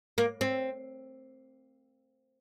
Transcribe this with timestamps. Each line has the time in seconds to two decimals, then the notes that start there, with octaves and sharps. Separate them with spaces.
0.18 A#3
0.41 C4